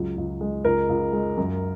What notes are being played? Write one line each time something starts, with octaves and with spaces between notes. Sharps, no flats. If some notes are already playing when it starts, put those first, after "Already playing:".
Already playing: C#2 F#3
C#2
G#3
C#2 A#4
C#2
G#3
F#2